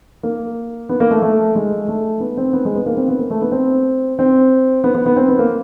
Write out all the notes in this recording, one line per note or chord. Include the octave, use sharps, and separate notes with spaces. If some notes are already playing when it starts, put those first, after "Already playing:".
A#3
B3
A#3
A3
A3
G#3
A3
B3
C4
B3
G#3
B3
A#3
C4
B3
A#3
A3
B3
C4
C4
B3
B3
B3
C4
B3
A#3